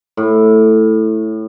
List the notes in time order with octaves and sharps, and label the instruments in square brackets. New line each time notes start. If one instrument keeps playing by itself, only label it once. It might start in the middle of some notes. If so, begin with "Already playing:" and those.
[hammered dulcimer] A2